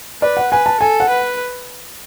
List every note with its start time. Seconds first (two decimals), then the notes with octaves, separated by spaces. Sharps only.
0.22 B4 D5
0.37 F#5
0.52 B4 G#5
0.66 A5
0.80 A4 G#5
1.00 F#5
1.09 B4